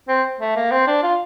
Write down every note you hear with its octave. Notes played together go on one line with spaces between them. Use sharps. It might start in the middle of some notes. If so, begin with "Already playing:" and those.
C4
A3
A#3
C4
D4
F4